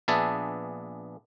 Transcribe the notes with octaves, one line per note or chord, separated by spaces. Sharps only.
A#1 B3 D4 G#4 E5 A5